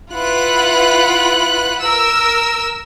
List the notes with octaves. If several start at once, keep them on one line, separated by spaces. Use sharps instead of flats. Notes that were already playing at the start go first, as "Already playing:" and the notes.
E4 F4 B4 F#5 B5 F#6
A#4 E6